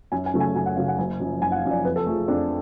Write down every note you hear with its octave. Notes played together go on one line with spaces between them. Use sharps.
F#2 G#5
G#5
C#3 F#3 A3
G#5
F#2 G#5
F#5
C#3 F#3 A3 F5
F#5
F#1 G#5
F#2 F3
F#1 G#5
F#5
F5
F#2 F3
D5
F2 B4
A4
F3 A3 G#4
F2 D4